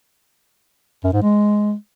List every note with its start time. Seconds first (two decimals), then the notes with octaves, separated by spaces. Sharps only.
1.04 F#2
1.13 G#2
1.22 G#3